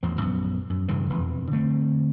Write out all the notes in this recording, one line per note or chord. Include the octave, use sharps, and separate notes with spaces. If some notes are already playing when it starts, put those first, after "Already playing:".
A1 E2 F3
A#1 F#2 D3 B3
F#2
E1 G2 C#3 E3
E1 F2 E3
D3 A3 C4